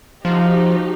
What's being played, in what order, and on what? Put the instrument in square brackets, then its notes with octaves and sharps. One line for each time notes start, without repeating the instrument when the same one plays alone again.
[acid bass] F3 [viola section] D#4 F#4 G4